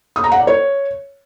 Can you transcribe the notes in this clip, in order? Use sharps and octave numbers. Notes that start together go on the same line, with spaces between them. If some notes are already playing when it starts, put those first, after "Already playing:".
D#6
A#5
F#5
D5
C#5